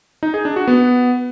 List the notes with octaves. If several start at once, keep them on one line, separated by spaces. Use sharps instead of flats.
D#4
G#4
D4
F#4
B3